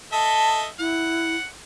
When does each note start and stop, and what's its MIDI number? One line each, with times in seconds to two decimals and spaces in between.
0.12 0.67 69
0.12 0.67 75
0.12 0.67 76
0.12 0.59 81
0.79 1.36 64
0.79 1.45 78